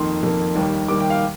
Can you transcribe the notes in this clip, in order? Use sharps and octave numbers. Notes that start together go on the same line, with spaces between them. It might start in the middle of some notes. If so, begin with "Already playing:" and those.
Already playing: F2 D#3 A#3 C6
F2 D#3 A#3
D#2 D#3 G3 A#3
D#2 D#3 G3 A#3 D6
G5
F5